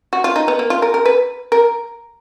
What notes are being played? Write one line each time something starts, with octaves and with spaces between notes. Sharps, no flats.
F#4
F4
D#4
B3
A#3
F4
A#4
A#4
B4
A#4